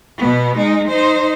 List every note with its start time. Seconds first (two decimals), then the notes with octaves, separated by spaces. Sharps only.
0.18 B2 B3
0.58 G#3 D#4
0.88 D#4 C5